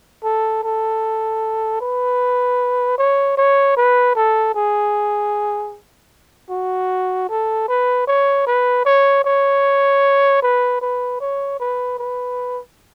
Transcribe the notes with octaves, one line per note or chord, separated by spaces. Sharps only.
A4
A4
B4
C#5
C#5
B4
A4
G#4
F#4
A4
B4
C#5
B4
C#5
C#5
B4
B4
C#5
B4
B4